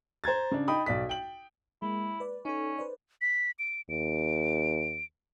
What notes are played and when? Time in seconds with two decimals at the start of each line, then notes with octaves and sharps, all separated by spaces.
0.24 C5 A#5 G#6 A6
0.51 C#3 D4
0.68 D#4 G5 B5 D#6
0.86 B1 D5 B6
1.09 G5 F#7
1.82 G#3 A#3 E4
2.20 B4 D5
2.45 C#4 D#4 A4
2.78 B4 C5 D5
3.22 B6
3.59 D7
3.89 D#2 D7